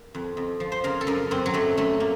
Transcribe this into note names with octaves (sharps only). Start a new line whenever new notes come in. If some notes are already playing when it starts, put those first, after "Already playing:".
Already playing: A#4
F2
F2
F3
C5
C#3 A#4
A4
F#2 A#4
F#2 C4
F#3
F#2 A3
F#2 A3
A#3